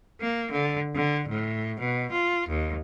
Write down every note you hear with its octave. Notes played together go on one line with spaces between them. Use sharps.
A#3
D3
D3
A2
B2
F4
D#2